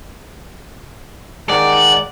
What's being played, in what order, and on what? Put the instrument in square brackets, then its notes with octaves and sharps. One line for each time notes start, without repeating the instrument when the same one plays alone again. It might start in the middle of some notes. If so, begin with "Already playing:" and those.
[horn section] D#3 G#3 F#5 [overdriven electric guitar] D5